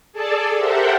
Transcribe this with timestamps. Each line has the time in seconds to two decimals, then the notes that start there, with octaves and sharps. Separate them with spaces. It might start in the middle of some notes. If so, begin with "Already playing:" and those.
0.12 G#4 A4 D5 A5
0.56 G4 A4 A#4 C5 E5 F#5